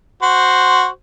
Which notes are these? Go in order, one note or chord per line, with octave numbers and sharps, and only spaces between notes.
F#4 C5